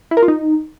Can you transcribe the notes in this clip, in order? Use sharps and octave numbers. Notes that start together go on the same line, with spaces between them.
E4
A#4
F4
D#4